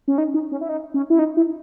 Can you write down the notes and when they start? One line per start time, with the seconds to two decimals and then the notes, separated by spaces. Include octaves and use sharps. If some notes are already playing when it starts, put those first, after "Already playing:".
0.08 C#4
0.18 D#4
0.34 D#4
0.52 C#4
0.61 E4
0.69 D#4
0.94 C#4
1.10 E4
1.19 D#4
1.37 E4